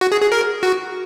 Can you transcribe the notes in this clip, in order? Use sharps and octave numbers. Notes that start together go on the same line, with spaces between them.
F#4
G#4
G#4
A#4
F#4